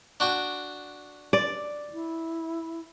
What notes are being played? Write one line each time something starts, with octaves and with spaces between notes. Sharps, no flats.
D4 F#4 G5
D5
E4